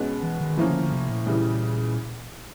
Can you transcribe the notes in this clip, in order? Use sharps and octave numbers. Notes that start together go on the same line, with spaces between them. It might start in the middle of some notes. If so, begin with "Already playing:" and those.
Already playing: B2 G#3 C#4
E3
D#3
A2 E3 F3 A#3 C#4
D3
D3
C3
A#2
C#3 E3 G3